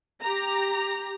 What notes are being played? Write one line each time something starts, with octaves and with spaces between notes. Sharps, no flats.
G4 A#5